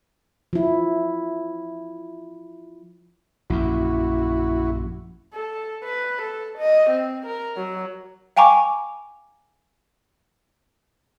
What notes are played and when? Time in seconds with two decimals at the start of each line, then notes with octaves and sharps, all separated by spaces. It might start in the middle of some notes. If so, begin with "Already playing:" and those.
0.53 F3 E4
3.50 A#1 F#2 E4 F#4
5.34 A4
5.84 B4
6.22 A4
6.58 D#5
6.90 C4
7.26 A#4
7.56 F#3
8.36 F5 G5 G#5 A#5 C#6 D6